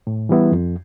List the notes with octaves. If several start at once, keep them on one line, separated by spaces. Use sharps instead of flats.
A2
E3 G3 B3 E4
F2